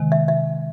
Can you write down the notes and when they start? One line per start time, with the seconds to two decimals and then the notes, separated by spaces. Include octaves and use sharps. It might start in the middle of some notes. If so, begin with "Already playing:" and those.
Already playing: C3 D#3 G#3
0.12 E5
0.28 E5